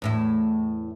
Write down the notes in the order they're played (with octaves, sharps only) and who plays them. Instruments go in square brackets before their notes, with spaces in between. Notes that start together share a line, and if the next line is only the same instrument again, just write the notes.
[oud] E2 A2 E4